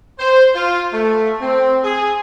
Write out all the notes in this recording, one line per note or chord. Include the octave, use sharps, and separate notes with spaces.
C5
F4
A3
C4
G#4